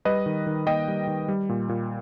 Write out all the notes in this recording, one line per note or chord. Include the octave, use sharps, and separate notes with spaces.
G3 B4 D#5
D#3
D#3
A#3 D#5 G5
G3
D#3
G3
A#2
A#2